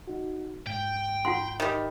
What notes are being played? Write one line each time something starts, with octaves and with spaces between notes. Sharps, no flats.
D#4 F#4
G#2 G5
F4 F#5 C6
D#3 G3